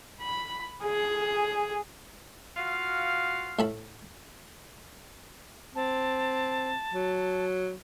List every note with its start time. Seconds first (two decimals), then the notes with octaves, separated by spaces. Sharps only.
0.21 B5
0.83 G#4
2.57 F4 F#4 F5
3.59 A2 A5 B5
5.75 C4 A5
6.94 F#3